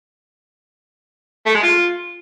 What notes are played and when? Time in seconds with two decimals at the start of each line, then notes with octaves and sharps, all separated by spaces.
1.46 A3
1.54 G#3
1.63 F4